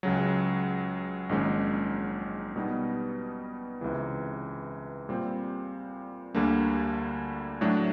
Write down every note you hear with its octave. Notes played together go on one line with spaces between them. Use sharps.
C#2 C#3 F#3
A#1 G#2 D#3 G#3 C#4
B2 G3 B3 D#4
C#2 C3 E3
A#2 G3 C4
D2 D3 G3 A#3 D4
A2 F#3 A3 D4